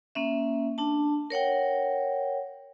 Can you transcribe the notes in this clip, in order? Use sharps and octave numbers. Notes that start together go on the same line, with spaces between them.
A#3 C#4 E5
D4 A5
A#4 C#5 F#5 G5